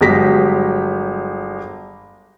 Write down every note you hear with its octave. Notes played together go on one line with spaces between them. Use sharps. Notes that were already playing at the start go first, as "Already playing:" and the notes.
G1 F#3 G#3 G4 A#6 B6